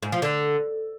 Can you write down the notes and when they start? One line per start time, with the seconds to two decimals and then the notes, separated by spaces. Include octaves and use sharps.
0.03 G#2
0.12 F3
0.22 D3